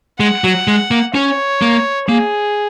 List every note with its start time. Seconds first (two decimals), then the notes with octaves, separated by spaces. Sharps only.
0.20 G#3 F#5
0.44 F#3
0.68 G#3
0.91 A#3
1.14 C#4 C#5
1.62 A#3
2.09 A#3 G#4